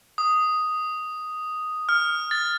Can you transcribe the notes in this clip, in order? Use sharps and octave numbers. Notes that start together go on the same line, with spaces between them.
D#6
F6
A6